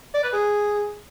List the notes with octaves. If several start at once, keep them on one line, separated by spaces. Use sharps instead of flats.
D5
B4
G#4